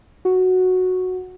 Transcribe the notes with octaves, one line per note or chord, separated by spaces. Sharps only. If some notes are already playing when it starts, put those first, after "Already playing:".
F#4